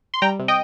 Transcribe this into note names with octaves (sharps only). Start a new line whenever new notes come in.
C6
G3 G5 A#5
C3
D#5 G5